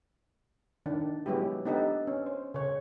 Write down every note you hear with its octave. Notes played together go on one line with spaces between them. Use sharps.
D#3 D4
F#3 G#3 B3 E4 G4
B3 D4 D#4 G4 A4 B4
C#4
C5
C#3 C#5